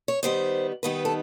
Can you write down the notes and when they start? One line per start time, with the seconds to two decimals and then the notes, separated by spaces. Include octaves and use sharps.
0.08 C#5
0.23 D#3 G3 B3 D#4 C5
0.83 D#3 G3 B3 D#4 B4
1.05 A4